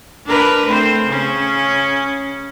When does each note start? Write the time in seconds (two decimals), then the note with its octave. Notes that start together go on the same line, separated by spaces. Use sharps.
0.26 D4 A#4 B4
0.67 A3 C4 C5
1.07 C#3 C#4